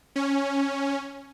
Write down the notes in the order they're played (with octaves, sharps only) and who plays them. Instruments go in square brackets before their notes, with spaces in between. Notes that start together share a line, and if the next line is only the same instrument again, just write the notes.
[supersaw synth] C#4